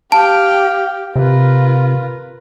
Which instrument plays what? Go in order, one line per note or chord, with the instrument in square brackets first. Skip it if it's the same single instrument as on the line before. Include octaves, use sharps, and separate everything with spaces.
[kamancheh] G4 [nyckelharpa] F5 G5 [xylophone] A5
[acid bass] C3 [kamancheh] F4 [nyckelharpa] A#4 B4